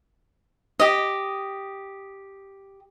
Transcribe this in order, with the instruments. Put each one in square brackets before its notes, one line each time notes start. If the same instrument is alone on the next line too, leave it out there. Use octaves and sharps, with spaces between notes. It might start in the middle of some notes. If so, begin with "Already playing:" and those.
[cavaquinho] G4 D#5